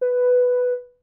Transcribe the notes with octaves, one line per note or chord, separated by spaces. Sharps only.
B4